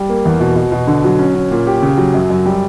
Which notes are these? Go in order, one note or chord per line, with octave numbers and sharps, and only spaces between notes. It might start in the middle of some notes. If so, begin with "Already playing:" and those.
Already playing: G3
A#3
E2
B2
B2
B2
D3
F#3
C#4
C#4
A#2
G4
C#3
F#3
F#2
F#2
G3